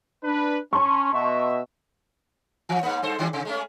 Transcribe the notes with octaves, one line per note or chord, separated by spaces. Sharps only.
D4 B4
C#4 A5 C6 C#6
B2 D#5 E5
E3 F3
G#2 A#3
G2 A4 C5
D#3 G3 D4
C3
G#3 A3 C#4